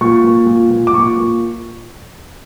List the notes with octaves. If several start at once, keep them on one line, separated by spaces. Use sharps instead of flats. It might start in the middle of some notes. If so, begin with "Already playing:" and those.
A#2 C#6
A#2
A#2
A#2
D6
A#2 C#6
A#2